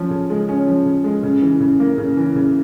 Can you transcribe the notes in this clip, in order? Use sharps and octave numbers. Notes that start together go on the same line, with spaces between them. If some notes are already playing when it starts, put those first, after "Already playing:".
Already playing: F3 C#4
C#3
G#3
C#4
F3
C#3
G#3
C#3
E3
C#3
A#3
C#3
E3
C#3